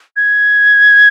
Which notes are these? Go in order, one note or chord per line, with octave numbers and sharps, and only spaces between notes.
G#6